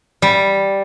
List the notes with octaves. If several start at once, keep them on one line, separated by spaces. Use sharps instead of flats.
G3